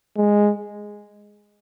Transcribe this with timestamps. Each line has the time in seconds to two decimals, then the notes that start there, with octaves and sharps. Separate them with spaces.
0.16 G#3